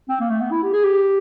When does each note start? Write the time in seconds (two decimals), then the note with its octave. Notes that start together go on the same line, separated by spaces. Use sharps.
0.09 C4
0.20 A#3
0.30 A3
0.41 B3
0.51 E4
0.63 G4
0.73 G#4
0.84 G4